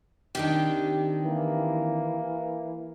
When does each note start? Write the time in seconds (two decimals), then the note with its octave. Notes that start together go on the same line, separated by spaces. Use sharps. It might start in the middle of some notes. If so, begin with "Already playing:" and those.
0.35 C3 D#3 D4 G4
1.23 E3 A#3